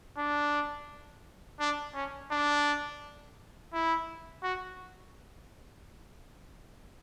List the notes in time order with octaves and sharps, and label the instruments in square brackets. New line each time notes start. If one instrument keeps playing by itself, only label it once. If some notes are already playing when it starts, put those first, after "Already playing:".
[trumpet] D4
D4
C#4
D4
E4
F#4